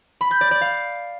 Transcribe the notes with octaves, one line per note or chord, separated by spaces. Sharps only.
B5
G6
D5
D5
F5